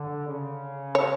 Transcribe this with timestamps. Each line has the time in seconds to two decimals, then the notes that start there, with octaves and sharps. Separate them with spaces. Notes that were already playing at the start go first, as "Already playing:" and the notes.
Already playing: D3
0.28 C#3
0.95 C#5